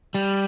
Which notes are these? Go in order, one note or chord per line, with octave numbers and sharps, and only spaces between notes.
G3